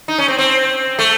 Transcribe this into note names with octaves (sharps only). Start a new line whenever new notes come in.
D#4
C#4
C4
C4
A3